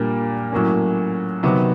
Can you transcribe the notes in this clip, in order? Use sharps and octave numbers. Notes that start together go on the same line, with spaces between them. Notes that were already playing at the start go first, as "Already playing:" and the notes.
Already playing: A#2 G3 A#3 D4
A2 F#3 A#3 C#4
C3 D#3 F#3 B3